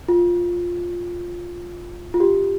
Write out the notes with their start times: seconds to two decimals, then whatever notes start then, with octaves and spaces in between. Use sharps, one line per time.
0.09 F4
2.14 F4
2.20 G4